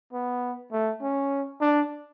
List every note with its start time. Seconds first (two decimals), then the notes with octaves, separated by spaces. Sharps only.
0.13 B3
0.72 A3
1.02 C#4
1.61 D4